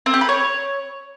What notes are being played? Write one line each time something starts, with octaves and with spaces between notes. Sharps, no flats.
C4
G4
B4
C#5